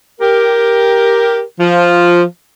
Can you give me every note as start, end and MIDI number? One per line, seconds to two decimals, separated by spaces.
0.20 1.42 67
0.20 1.42 70
1.59 2.23 53